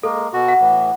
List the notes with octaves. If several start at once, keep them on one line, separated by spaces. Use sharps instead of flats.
G#3 A#3 A4
B2 F#4
F#5
A2 E3